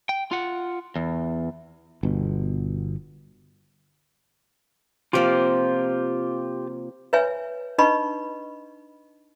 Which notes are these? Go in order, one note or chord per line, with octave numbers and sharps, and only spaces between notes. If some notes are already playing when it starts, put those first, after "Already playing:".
G5
F4 F#5
E2
G1 B2
C3 F3 A#3 F4 G4
B4 C#5 E5 G#5
D4 D#4 B4 D#5 B5 C#6